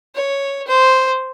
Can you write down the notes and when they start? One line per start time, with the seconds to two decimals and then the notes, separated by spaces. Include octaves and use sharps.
0.15 C#5
0.68 C5